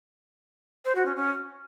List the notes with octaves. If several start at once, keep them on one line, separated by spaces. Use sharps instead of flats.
C5
F#4
C#4
C#4